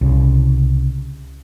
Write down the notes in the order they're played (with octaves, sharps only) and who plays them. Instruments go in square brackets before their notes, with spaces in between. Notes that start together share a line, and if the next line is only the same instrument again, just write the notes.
[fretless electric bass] C2 C#3